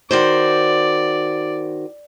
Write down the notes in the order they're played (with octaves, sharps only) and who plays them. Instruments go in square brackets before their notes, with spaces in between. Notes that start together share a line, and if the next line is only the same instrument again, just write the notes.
[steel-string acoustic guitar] D#3 F#4 C5 [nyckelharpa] D5